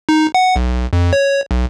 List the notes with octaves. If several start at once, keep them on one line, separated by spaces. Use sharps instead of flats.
D#4
F#5
B1
F2
C#5
B1